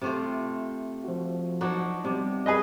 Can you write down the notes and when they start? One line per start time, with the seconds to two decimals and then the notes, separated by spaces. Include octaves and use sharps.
0.01 C3 A3 F4
1.04 F3 F#4
1.61 F#3 D4 D#4
2.05 C3 G3 B3
2.46 G3 G#4 B4 D#5